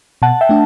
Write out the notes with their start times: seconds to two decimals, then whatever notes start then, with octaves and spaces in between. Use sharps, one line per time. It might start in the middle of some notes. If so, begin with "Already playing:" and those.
0.22 B2 F#5 A5
0.41 E5 G5
0.49 A3 D4